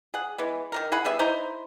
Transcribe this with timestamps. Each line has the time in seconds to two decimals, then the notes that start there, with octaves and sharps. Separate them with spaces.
0.14 G#4 F#5
0.38 E3 G#3 B3
0.72 D#3 G3 A#4
0.92 E4 G#4 F#5 B5
1.04 G3 B3 G#4 E5
1.19 D#4 E4 C5 A#5